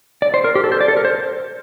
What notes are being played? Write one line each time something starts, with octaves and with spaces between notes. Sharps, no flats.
D5
C5
A#4
G4
A4
C5
D5
A4
A#4
C5